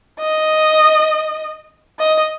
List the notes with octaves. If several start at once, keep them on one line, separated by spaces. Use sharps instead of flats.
D#5
D#5